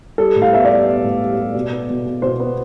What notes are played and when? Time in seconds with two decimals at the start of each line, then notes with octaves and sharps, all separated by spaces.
0.18 G3 A4
0.36 A2
0.42 F5
0.52 B3 E5
0.65 G3 D5
0.86 B3
1.04 A2
1.21 G3
1.38 G3
1.55 B2
1.72 B3
1.89 B2
2.06 B2
2.22 B2 C5
2.40 B3